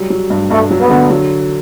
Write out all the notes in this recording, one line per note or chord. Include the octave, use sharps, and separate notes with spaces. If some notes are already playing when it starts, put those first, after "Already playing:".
Already playing: F#3 G3
F#3
G2
G2 A3
F#3
B3
D3
F#3